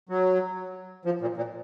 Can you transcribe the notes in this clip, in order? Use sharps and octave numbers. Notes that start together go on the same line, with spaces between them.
F#3
F3
A#2
A#2